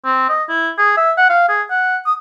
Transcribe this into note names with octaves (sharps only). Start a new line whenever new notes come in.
C4
D#5
E4
G#4
E5
F#5
F5
G#4
F#5
D#6